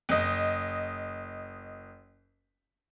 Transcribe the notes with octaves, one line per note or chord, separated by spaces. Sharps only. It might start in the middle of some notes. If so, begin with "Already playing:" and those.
F#1 D#5